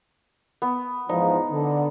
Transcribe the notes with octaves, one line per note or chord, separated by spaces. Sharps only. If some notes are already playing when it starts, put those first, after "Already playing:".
B3
E2 G#2 F3 D#4
D3